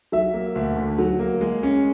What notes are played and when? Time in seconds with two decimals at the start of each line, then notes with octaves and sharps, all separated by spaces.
0.12 F#3 E5
0.34 A#3
0.55 D2
0.77 D3
0.98 F#3
1.19 A#3
1.41 G#3
1.63 C#4